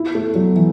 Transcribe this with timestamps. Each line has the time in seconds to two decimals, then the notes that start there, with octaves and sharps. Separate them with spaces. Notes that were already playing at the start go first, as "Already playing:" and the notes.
Already playing: E4
0.15 A3
0.35 F#3
0.56 E3